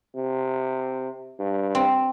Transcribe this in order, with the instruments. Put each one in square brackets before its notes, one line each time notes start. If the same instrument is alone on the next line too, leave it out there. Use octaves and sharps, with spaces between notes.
[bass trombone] C3
G2
[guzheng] C4